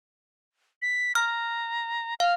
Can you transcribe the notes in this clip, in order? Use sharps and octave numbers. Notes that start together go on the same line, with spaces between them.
B6
A#5 F6
F5 F6